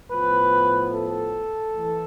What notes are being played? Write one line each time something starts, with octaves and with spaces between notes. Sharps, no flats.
A2 F3 B3 B4
A4
E3 A3